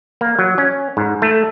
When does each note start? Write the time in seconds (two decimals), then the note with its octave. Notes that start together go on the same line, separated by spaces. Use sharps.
0.21 A#3
0.39 F#3
0.58 C#4
0.97 G#2
1.22 A3